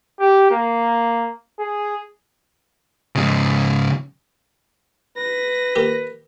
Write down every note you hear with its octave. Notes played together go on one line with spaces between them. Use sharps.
G4
A#3
G#4
G#2 C#3
B4 A#6
A#2 D#3 G4